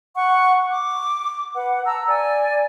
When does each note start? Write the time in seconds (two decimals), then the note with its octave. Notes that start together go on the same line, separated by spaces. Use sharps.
0.15 F#5 C#6
0.71 D6
1.55 B4 F#5
1.85 A5 A#5 E6
2.08 D5 G#5